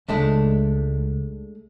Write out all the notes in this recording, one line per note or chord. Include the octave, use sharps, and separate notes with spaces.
C#2 G#3 A3 D4